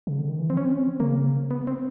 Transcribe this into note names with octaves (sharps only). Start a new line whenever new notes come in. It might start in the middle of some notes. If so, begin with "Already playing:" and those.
C#3
D3
D#3
E3
F3 C4
C#4
C4
C#4
C4
C#3 A#3
B3
C4